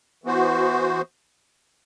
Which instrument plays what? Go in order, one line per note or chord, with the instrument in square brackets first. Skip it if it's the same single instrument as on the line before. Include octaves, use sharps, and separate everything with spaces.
[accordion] E3 B3 F#4 C5